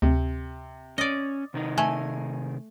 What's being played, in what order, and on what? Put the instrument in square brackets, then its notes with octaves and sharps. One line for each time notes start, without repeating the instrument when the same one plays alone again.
[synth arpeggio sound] D2 [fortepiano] C3
[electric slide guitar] C#4 [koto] D5 D#5
[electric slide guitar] C3 D#3 D#4
[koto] A3 [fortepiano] G#5